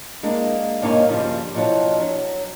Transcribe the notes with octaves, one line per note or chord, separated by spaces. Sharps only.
G#3 A#3 D4
G2 B2 A#3 D#4 C#5 G#5
G2 C#3 F3 G3
B2 F3 F#3 D4 F#4
F#3